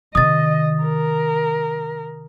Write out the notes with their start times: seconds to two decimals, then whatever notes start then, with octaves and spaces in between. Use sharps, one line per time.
0.15 C3 D#3 D#5 D#6 A6
0.82 A#4